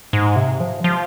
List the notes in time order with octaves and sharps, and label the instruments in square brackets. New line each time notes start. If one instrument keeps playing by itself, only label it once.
[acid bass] G#2
C3
F3
F3